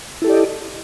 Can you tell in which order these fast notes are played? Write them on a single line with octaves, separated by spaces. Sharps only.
E4 A4 G4 D5 D#5